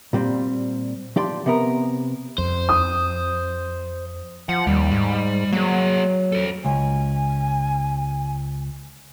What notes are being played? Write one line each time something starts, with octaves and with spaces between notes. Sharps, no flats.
A#2 G3 C4
F3 G4 D5 C6
C3 B3 A#4
F2 C5
D#6
F3 F#5
D#2 G3
G#2
F#3 A#3 G#4
A4 C5
C#2 G#5